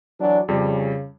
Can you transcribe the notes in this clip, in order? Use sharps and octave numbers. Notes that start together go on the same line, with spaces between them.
E3 F#3 D4
F2 C#3 G3